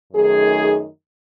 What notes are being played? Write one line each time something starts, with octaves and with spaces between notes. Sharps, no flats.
F#2 D#3 A3 D#4 G#4